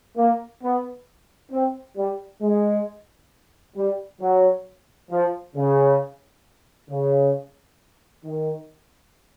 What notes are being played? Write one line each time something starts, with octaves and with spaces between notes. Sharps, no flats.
A#3
B3
C4
G3
G#3
G3
F#3
F3
C#3
C#3
D#3